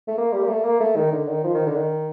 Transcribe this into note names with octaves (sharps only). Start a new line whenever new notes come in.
A3
A#3
G3
A#3
A3
A#3
A3
D#3
D3
D#3
F3
D#3
D3
D#3